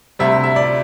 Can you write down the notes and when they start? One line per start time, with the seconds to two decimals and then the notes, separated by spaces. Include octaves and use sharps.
0.19 D2 C3 G3 C4 E5
0.44 E5
0.56 D5